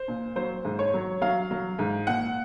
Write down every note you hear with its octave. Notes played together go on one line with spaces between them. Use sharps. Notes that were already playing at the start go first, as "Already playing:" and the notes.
Already playing: C5
A#2
F#3 C5
G#2
C#5
F#3
F#3 F5
F#3
G#2
A#2 F#5